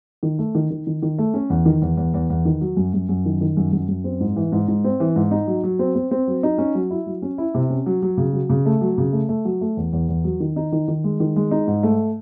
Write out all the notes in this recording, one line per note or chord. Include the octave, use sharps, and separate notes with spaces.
D#3
A3
D#3
D#3
D#3
D#3
A3
C#4
E2
D#3
E2
E2
E2
E2
D#3
F#3
F#2
F#2
F#2
D#3
D#3
F#2
F#2
F#2
C4
G#2
E3
G#2
G#2
C4
E3
G#2
D#4
F#3
F#3
C4
C4
C4
F#3
D#4
C#4
F#3
E4
F#3
C#4
E4
C3
C#4
F#3
F#3
C#3
F#3
C#3
A3
F#3
C#3
A3
A3
F#3
A3
E2
E2
E2
F#3
D#3
D#4
D#3
D#3
G#3
D#3
G#3
D#4
G#2
A3